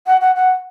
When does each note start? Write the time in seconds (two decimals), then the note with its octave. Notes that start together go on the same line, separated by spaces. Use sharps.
0.07 F#5
0.21 F#5
0.36 F#5